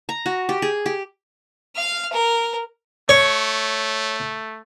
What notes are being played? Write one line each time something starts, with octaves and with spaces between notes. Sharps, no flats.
A#5
F#4
G4
G#4
G4
F5 F6
A#4
A3 C#5